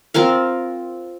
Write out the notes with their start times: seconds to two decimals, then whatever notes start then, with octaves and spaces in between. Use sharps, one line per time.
0.14 C4 F4 A#4 F5